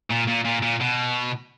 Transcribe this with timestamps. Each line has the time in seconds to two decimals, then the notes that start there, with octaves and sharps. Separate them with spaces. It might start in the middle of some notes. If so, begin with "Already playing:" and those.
0.10 A#2
0.27 A#2
0.45 A#2
0.63 A#2
0.81 B2